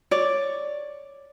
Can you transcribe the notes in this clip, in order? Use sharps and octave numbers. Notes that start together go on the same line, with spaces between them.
C#5 D5